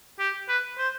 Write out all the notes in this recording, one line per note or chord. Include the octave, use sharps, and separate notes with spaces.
G4
B4
C5